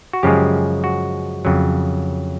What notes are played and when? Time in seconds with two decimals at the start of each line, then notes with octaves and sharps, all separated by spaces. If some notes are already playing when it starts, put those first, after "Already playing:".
0.13 F#4
0.23 F#2 C#3 F3 G#3 G4
0.84 F#4
1.45 F2 C#3 F#3